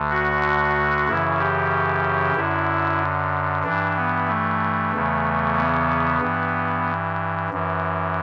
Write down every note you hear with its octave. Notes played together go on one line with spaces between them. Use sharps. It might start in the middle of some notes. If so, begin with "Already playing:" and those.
Already playing: D2 D3
F#4
F#2 C#3 E3 E4
G4
F#2 D3 E4
G2 E3 D4
B3
A3
E2 C#3 E3
B3
G2 E3
F#2 E3